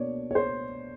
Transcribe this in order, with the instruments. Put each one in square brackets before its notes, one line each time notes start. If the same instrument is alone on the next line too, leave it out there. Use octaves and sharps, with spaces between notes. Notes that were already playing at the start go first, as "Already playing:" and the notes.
Already playing: [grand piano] B2 A#3 D4 C#5 D5
C#5
C5